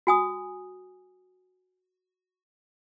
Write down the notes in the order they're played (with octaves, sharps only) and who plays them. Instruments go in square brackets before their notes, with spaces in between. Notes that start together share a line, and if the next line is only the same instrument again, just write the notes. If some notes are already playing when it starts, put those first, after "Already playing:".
[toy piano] F#4 G#5 D#6